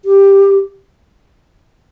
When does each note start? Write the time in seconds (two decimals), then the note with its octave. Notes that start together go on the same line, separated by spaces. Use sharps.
0.05 G4